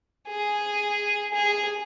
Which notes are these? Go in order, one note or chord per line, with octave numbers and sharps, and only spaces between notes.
G#4
G#4